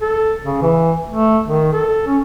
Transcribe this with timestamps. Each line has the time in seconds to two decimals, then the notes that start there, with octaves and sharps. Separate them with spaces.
0.01 A4
0.43 C#3
0.62 E3
1.11 A3
1.48 D#3
1.72 A4
2.07 C#4